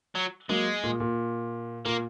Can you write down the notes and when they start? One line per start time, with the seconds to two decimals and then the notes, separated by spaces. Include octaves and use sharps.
0.15 F#3
0.49 F#3 G#3 A#3
0.83 A#2
1.00 A#2
1.85 A#2 A#3